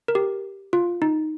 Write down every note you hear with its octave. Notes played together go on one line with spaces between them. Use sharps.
A#4
G4
F4
D#4